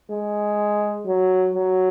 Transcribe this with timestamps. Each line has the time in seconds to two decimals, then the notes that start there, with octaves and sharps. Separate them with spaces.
0.10 G#3
1.06 F#3
1.54 F#3